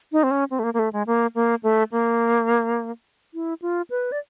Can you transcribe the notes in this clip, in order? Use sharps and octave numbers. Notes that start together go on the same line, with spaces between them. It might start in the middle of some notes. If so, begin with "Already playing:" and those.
D#4
C4
C#4
C4
A3
A#3
A#3
A3
G#3
A#3
A#3
A3
A#3
E4
F4
B4
D5